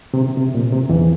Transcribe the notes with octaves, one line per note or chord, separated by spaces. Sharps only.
C3
C3
A#2
C3
E2 E3